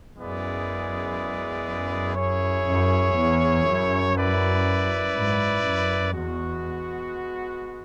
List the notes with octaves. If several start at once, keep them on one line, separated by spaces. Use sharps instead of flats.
F#2 G#3 B3 E4 G#4 D5
F#2
E4 G#4 C#5
F#2
E2
F#2
E4 B4 D5
G#2
F#2
E2 G#3 B3 F#4